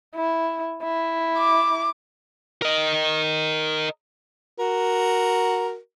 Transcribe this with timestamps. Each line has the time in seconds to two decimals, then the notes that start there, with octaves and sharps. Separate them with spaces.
0.15 E4
0.82 E4
1.38 D6
2.62 A#4 D#5
4.59 F#4 A#4